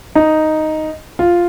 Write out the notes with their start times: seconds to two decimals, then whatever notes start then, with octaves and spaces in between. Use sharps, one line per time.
0.15 D#4
1.19 F4